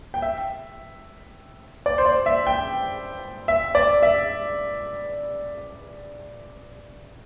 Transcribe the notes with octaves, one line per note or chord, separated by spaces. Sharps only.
G5
E5
D5
C5
D5
E5
G5
E5
D5
E5